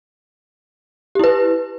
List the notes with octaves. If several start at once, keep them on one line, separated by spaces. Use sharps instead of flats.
E4 G4 B4